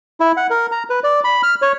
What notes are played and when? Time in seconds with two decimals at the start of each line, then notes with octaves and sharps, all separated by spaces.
0.20 E4
0.37 F#5
0.50 A#4
0.72 A#5
0.90 B4
1.04 D5
1.24 B5
1.43 F6
1.62 C#5